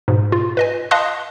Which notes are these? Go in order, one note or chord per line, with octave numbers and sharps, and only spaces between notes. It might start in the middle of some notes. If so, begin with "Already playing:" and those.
G#2 B2
F4
B4 D#5 G#5
D#5 F5 A5 C6 D#6 F#6